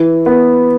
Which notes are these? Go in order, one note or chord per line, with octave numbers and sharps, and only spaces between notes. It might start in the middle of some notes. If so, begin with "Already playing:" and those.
Already playing: E3
B3